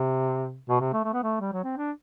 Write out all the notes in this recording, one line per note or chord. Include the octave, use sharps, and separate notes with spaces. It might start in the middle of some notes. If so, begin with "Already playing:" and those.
Already playing: C3
B2
C3
A3
A3
B3
A3
G3
F#3
C4
D4